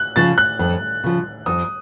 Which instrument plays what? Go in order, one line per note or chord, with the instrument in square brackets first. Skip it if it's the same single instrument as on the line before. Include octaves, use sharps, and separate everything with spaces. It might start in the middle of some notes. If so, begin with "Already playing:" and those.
Already playing: [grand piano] F#6
[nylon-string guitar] C#3 F3 [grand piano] A6
[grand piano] F#6
[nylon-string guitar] F2
C#3 F3
[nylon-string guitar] F2 [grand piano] D#6